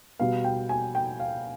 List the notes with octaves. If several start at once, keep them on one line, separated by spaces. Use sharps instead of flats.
B2 G3 B3 F5
G5
G#5
G5
F5